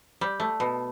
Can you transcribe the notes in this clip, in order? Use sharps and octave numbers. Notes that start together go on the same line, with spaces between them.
G3
A3
B2